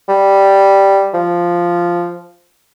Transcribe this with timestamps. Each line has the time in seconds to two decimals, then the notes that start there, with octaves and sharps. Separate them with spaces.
0.09 G3
1.14 F3